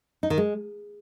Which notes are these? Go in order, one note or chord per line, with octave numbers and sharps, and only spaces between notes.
D#4
D#3
G#3